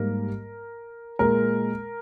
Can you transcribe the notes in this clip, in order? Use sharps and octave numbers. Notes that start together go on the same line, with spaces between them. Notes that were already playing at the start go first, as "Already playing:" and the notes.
Already playing: G#2 G3 A#3 A#4
A#2 G#3 A#4